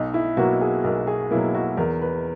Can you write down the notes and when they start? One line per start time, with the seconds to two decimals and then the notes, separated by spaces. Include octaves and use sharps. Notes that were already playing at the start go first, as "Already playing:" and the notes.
Already playing: B1 D#4
0.14 E4
0.37 B2 F#3 A#3 F#4
0.61 G#4
0.84 B1 A#4
1.07 G#4
1.31 B2 F#3 A#3 E4
1.54 F#4
1.77 E2 A#4
2.02 B4